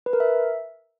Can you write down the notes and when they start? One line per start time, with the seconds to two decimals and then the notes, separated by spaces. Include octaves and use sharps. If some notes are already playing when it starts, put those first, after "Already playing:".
0.06 B4
0.13 A#4
0.20 E5